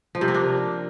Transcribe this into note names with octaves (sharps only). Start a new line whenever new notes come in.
F3
C3
A#3
D4